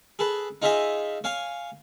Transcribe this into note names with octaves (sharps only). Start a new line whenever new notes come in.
G#4 A4 B4
D#4 F4 G#4 D#5 E5 G#5
C#5 F5 G#5